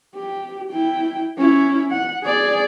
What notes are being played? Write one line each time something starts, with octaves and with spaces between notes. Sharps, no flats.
G4
E4 G5
C#4 E4
F#5
G#4 D5